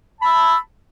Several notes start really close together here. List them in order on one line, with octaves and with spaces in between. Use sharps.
A5 B5 E6